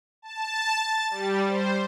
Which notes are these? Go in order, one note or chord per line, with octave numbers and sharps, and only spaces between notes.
A5
A6
G3
C5